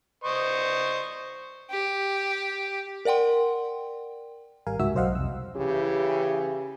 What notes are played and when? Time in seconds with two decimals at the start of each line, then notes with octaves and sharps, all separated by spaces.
0.24 C5 D#5 C#6
1.71 G4
3.05 A#4 D5 F#5 G5 C6
4.67 G#1 G3 A#4 F5 G#5
4.79 C#2 G#2 F#4 E5 E6
4.94 B1 F#3 C5 D#5 F5 F#5
5.15 C2 F2 E6
5.56 C#3 E3 E4 G4